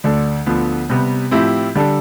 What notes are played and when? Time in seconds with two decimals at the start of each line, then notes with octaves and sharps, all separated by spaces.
0.04 D2 D3 A3 D4 A4
0.46 D2 D3 F3 B3
0.89 C3 G3 B3
1.31 A2 F3 C4 E4 G4
1.75 D3 G3 D4 A4